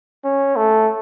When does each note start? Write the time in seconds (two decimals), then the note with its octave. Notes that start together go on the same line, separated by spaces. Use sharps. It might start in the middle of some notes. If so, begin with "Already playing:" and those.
0.25 C#4
0.56 A3